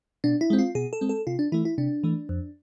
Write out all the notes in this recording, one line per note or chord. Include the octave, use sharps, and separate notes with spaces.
B2 D4
E4
G#3 C4
F4
B2 G#4
A4
G#3 C4
A4
C3 F4
D4
E3 A3 E4
E4
C3 D4
E3 A3
F2